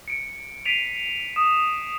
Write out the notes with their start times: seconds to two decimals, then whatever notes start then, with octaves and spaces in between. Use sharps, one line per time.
0.08 C#7 D7
0.65 B6 C7 D7 D#7 F7
1.36 D#6 E7